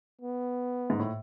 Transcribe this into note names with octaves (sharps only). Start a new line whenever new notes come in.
B3
G#2
A2